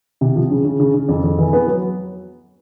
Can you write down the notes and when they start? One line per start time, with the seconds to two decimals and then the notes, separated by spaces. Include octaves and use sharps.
0.21 C3
0.36 F3
0.50 C#3
0.65 C#3
0.80 C#3
0.94 C#3
1.09 F2
1.23 F2
1.38 E3
1.53 B3
1.68 F#3